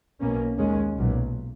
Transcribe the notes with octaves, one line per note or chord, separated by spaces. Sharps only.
B1 B2 A#3 C#4
D#2 D#3 G#3 C#4
B1 A#2 F#3